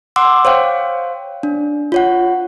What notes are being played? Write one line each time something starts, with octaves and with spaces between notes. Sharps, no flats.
F#5 C6 D6 E6
C5 C#5 F5 G5
D4
F4 C#5 F#5